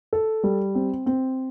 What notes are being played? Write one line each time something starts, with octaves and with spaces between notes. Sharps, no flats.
A4
G3
C4
C4